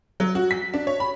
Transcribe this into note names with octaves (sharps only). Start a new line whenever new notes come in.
F#3
F#4
B6
D4
C#5
B5